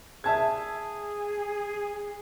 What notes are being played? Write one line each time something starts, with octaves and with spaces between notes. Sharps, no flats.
G#4 E5 A5 G#6